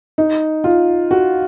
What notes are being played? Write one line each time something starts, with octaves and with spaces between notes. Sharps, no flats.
D#4
F4
F#4